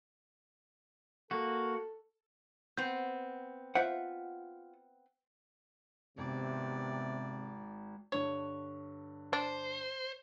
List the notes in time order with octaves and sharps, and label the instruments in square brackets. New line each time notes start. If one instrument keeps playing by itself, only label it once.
[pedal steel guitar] A#3 F#4 [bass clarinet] A4
[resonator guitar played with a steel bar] B3 C4 [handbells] G6
[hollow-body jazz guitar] F4 E5 F#5 [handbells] C5
[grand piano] G#1 [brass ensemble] C3 [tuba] B3 [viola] D5
[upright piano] G2 D3 [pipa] C#5
[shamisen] D4 [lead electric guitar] C5